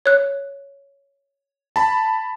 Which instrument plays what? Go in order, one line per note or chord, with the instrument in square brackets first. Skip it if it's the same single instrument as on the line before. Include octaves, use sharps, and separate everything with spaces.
[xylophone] C#5 F#6
[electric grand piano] A5 B5